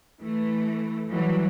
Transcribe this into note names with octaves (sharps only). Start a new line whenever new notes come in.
E3 A3
E3 F#3 G3